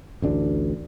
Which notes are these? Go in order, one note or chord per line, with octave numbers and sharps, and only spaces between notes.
A1 D2 D4